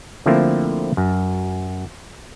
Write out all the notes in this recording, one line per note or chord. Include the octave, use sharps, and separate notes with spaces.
D3 F3 A3 A#3 C4 E4
F#2